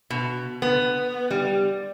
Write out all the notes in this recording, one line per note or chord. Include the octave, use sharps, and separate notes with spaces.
B2
B3
G3